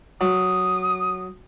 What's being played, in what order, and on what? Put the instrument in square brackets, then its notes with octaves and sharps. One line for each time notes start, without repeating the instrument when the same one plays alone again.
[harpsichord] F#3 [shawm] D#6